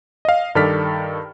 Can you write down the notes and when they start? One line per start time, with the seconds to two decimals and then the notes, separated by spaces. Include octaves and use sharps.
0.25 D#5 F5
0.55 G2 D#3 A4 D5 F6 B6